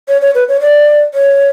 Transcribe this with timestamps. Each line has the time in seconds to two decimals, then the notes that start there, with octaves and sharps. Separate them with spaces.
0.08 C#5
0.22 C#5
0.35 B4
0.48 C#5
0.61 D5
1.14 C#5